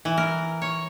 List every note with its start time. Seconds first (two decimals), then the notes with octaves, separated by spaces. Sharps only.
0.05 E3
0.17 A#4
0.62 C#5